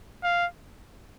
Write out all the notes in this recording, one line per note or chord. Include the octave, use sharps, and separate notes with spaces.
F5